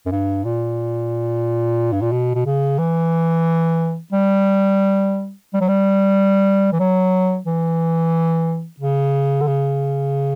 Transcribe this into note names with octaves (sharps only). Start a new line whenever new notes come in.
F#2
G2
A#2
G2
A#2
B2
B2
C#3
E3
G3
G3
F#3
G3
E3
F#3
E3
C#3
D3
C#3